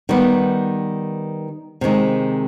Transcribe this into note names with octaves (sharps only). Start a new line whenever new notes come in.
D#3 G3 B3
C3 D#3 G#3